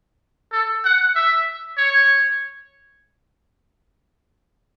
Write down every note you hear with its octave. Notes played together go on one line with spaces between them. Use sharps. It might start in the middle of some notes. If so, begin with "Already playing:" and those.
A4
F#5
E5
C#5